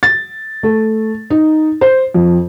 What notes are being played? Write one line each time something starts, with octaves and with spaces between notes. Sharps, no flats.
A6
A3
D#4
C5
F2